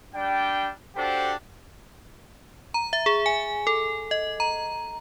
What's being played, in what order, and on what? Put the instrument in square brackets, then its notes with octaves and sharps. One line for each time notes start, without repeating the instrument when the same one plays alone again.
[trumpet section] G3 D4 G5
D4 F#4 G4 A4 C5
[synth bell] A#5
E5
G#4
G#5
A4
D#5
A#5